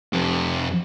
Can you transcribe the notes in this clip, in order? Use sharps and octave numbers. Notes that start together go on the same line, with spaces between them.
F2 G4